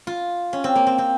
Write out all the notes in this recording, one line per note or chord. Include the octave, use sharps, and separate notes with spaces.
F4
C#4
C4
A#3
C4
C4